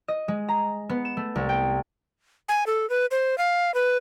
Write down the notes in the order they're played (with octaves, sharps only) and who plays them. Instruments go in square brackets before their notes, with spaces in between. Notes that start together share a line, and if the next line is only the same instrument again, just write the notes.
[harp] D#5
G#3
A#5
B3
E7
A3
C2
G5
[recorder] G#5
A4
B4
C5
F5
B4